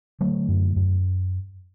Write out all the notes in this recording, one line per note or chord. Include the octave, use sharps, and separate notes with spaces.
D3 F#3 A3
F#2
F#2